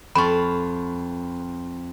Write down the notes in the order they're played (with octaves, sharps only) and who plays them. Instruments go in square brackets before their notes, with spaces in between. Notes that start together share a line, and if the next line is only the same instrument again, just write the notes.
[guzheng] F2 F4 [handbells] B5 C#6